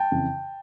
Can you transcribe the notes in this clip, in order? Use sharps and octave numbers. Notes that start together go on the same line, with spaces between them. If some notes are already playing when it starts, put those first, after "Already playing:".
Already playing: G5 A5
F2 C#3 E3